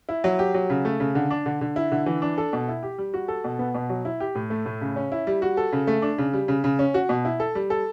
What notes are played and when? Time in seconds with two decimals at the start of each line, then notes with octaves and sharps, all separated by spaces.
0.09 E4
0.24 F#3
0.39 G4
0.54 F#3
0.70 C#3
0.85 A3
1.00 C#3
1.15 D3
1.30 D4
1.46 D3
1.61 D3
1.76 E4
1.92 D3
2.06 E3
2.22 D4
2.38 A4
2.53 B2
2.68 E4
2.83 G4
2.98 G3
3.14 F#4
3.28 A4
3.44 B2
3.59 B3
3.75 B2
3.89 F#3
4.05 E4
4.20 G4
4.35 A2
4.50 A3
4.66 A2
4.81 C#3
4.96 C#4
5.12 E4
5.27 G3
5.42 F#4
5.57 A4
5.72 C#3
5.87 A3
6.02 D4
6.18 C#3
6.33 G3
6.48 C#3
6.64 C#3
6.79 C#4
6.94 F#4
7.09 B2
7.25 E4
7.40 A4
7.55 G3
7.70 A4